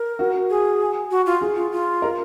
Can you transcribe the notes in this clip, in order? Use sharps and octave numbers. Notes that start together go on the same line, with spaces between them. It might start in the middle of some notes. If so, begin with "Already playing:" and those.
Already playing: A#4
F#4
G#4
F#4
F4
G#4
F4
F4
A#4